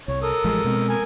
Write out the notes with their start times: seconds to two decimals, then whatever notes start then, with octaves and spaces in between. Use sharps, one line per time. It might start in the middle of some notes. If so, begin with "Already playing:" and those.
0.08 C2 C#5
0.22 A4 A#4 D#6
0.44 A1 F3 G#3
0.64 B2 G#3 C4
0.89 A#4 G#5